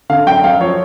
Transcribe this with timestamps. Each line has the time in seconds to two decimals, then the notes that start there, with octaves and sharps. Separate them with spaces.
0.09 D3 F5
0.27 F#2 G5
0.44 F#2 F5
0.60 F3 C#5